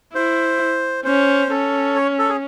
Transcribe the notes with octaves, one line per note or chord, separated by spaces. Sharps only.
E4 C5
C#4 C5
C#4 A4
C#5
A4
G#4